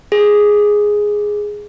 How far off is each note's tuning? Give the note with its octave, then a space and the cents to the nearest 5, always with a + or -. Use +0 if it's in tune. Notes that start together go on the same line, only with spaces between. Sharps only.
G#4 +0